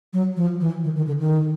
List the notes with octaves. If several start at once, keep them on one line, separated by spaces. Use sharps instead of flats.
F#3
F3
E3
D#3
D#3
D3
D#3